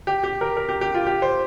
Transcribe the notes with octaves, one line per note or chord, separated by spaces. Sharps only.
G4
G4
A#4
A#4
G4
G4
F4
G4
C5